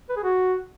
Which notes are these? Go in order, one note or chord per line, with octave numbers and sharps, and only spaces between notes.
B4
G#4
F#4